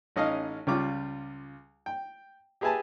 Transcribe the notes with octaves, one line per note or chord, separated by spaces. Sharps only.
A1 C#4 D#4 D#5 F5 F6
C#2 C#3 G3 F4 C#5 D6
G5
G4 G#4 B4 E5 G#5 A5